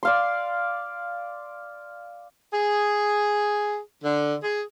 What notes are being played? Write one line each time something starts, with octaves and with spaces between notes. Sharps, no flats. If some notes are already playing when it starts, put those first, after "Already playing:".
D5 F5 C6
G#4
D3
G#4